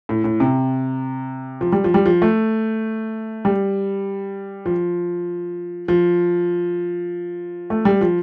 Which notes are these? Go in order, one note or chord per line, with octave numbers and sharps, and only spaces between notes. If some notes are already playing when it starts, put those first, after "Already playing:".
A2
A2
C3
F3
G3
F3
G3
F3
A3
G3
F3
F3
A3
G3
F3